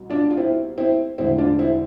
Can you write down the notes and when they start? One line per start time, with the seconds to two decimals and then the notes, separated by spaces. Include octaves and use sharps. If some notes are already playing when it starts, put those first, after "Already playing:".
Already playing: C2 B2
0.10 D4 F4
0.31 F4
0.38 C4 E4
0.78 C4 E4
1.18 E1 D2 D3 C4 E4
1.38 D4 F4
1.59 C4 E4